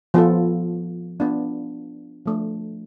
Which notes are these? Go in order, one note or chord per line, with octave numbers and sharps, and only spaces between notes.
F3 B3 F4 A4
B3 D4 F4
F3 A3 D4